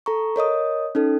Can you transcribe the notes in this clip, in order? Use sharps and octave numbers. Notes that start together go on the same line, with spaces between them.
A4 A#5 C#6
A#4 C#5 D#5 D#6
C#4 D#4 A4